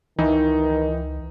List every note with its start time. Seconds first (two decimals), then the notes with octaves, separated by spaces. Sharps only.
0.19 C#2 D#3 E3 D#4